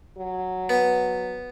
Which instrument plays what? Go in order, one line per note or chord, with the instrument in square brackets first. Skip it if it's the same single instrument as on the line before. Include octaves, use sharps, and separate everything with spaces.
[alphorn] F#3
[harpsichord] B3